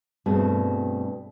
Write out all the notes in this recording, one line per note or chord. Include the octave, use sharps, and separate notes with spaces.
G2 B2 A3 C4 G#4